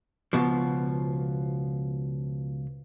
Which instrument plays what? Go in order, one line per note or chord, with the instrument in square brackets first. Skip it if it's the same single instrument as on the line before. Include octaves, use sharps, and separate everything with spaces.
[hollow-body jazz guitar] C#2 B2 F3